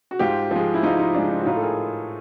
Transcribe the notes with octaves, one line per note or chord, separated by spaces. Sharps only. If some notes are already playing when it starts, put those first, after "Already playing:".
F#4
G#2 F4 G4
F3 G#3
E4
G#2 D#4 F4
D#4
F3 G#3 D4
D#4
F#4
A2 D#4 F4
A4
G#4 A#4